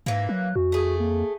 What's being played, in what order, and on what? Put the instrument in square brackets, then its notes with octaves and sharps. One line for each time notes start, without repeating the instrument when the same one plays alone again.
[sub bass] G#2 [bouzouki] E3 A#3
[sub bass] F#3 [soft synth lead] F#6
[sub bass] F2 [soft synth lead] F#4
[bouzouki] A3 G#4
[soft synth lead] A#3